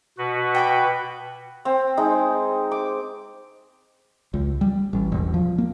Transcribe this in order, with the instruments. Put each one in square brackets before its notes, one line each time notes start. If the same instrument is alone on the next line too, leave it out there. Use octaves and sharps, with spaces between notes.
[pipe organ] B2 F#4 B4
[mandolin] G5 A5 D6
[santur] C4
G#3 D#4
D6
[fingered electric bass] C#2
G3
A1
E1
F3
A#3